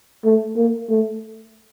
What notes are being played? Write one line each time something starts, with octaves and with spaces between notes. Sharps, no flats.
A3
A#3
A3